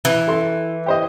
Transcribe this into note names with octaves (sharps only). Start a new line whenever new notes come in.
E3
A4 C6
G4 C5 D#5